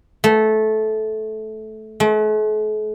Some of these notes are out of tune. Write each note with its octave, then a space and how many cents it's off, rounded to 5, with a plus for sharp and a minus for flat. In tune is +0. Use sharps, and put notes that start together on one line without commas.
A3 -15
A3 -45